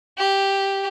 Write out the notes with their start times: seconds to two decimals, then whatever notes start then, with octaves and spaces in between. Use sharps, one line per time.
0.18 G4